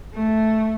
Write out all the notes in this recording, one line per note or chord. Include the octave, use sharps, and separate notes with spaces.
A3